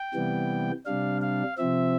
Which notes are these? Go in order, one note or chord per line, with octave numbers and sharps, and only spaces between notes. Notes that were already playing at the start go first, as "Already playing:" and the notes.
Already playing: G5
C3 E3 G3 B3
C3 G3 D4 F5
F5
C3 F3 C4 E5